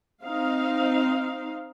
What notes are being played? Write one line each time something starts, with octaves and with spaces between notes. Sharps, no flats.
C4 D#4 F5